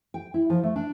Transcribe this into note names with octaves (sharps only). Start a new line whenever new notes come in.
G5
E4
F3
A3
D4